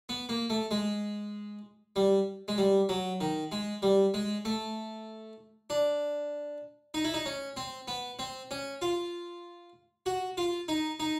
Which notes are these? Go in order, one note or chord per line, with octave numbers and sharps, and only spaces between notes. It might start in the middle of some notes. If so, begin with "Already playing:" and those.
B3
A#3
A3
G#3
G3
G#3
G3
F#3
D#3
G#3
G3
G#3
A3
D4
D#4
E4
D#4
C#4
C4
B3
C4
C#4
F4
F#4
F4
D#4
D#4